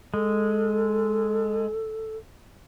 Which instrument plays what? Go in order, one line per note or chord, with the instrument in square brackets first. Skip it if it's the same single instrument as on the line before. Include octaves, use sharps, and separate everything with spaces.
[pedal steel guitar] G#3 [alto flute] A4